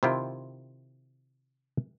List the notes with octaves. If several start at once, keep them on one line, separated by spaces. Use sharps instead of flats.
C3 D#3 E4 F4 G5